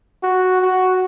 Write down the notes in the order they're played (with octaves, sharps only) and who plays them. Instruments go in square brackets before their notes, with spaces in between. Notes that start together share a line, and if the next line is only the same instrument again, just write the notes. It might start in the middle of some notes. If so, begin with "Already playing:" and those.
[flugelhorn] F#4
F#4